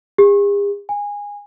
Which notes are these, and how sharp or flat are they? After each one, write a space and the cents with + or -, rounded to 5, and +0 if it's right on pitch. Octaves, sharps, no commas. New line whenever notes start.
G#4 -45
G#5 -20